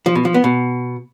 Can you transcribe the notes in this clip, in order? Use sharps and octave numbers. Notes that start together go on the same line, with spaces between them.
F3
B2
F3
B3
B2